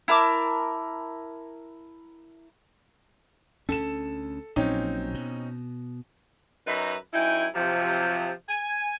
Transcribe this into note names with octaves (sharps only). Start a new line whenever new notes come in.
E4 A#4 A5 D6
D2 C#4 A4 E7
A#1 A#2 F#3 C4 C#4 D#4
B2
F#2 D#4 B4 E5 A#5 B5
F#2 D#4 E4 G5 G#5
C3 F3 F#3
G#5